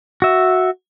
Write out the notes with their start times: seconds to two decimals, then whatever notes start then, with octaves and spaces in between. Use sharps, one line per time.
0.22 F#4 E5